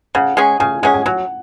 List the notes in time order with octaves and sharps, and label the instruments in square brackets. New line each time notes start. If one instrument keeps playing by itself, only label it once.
[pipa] C#3 [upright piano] F#5
[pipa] G#3 C#4 G#4
[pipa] C#3 [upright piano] G#5
[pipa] G#3 C#4 G#4 [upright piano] F#5
[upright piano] G#5
[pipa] F#3 [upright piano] F#5